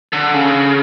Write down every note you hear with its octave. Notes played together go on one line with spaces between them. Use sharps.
D3
C#3